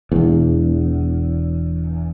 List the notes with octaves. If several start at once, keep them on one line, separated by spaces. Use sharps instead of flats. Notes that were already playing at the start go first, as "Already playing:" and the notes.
E1 E2